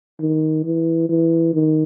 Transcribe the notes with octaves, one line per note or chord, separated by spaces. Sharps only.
D#3
E3
E3
D#3